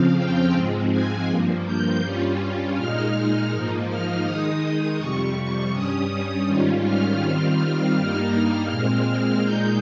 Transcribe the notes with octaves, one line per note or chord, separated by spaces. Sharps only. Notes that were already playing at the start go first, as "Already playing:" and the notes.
Already playing: F2 C#3 F3 C4 F5
G5
G#2 F3 G#3 C4
G#5
G2 F3 A#3
G6
G2 G3 C#4 F4
A#2 G#3 D#4 F6
G#2 F3 A#3 D#4
F6
D#3 G#3 D#4 D#6
F2 C3 G3 C#6
C#6
G2 G3 C#4 D#6
G#2 D#3 G3 C#4 F4
F6
D#3 G3 C4 F4 F6
G2 G3 A#3 D#4 F6
A#2 G#3 C4 F6
A#2 G#3 D#4 G6